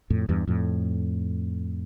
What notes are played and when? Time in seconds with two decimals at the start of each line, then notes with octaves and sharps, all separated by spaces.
0.10 F2 A2
0.29 E2 G2
0.47 F2 A2